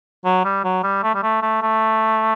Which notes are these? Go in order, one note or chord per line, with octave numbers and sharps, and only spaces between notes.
F#3
G3
F#3
G3
A3
G3
A3
A3
A3